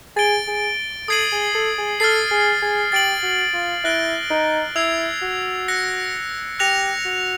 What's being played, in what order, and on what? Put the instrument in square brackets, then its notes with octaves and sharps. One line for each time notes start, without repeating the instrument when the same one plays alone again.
[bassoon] G#4 [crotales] A6 D7 G7
[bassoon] G#4
[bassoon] A4 [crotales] D#6 G#6 C7 D#7 F#7
[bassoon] G#4
A4
G#4
[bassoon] A4 [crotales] F6 A6 C7
[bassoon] G#4
G#4
[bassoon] G4 [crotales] A6 D7 F#7
[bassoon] F#4
F4
[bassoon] E4 [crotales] F#6 A#6 D7 G7
[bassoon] D#4
[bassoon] E4 [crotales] E6 G#6 C7 F7
[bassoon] F#4
[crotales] F#6 A#6 C#7
[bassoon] G4 [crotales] F#6 A#6 C#7 F7
[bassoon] F#4